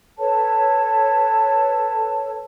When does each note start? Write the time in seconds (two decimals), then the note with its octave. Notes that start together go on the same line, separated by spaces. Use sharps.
0.19 A4 B4 C#5 A5